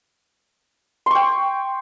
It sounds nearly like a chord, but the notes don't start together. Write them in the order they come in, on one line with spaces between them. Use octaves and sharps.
C6 C#6 G5